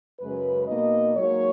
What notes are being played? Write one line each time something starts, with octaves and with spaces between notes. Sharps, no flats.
F#2 C#3 G#3 B4
B2 A#3 D#4 D#5
G#2 F#3 A#3 C#5